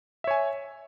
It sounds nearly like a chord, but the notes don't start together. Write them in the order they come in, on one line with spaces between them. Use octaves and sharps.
E5 C#5 G#5